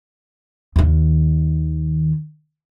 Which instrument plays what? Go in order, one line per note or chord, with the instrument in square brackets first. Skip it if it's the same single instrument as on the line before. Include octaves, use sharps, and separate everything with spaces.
[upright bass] D#2 D#3